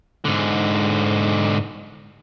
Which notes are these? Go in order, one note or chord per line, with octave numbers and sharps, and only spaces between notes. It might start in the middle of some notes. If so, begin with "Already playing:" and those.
G#2 D3